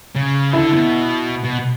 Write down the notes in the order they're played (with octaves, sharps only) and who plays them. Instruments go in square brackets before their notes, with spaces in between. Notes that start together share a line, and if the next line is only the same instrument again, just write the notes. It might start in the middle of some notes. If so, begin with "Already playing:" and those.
[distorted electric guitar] C#3
[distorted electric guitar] D3 [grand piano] E4
[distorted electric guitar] B2
B2